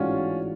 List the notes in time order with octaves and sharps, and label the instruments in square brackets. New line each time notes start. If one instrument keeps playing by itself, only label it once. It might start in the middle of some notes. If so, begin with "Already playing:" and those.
Already playing: [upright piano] A1 G#2 G#3 D4 F#4 [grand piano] C#4 F4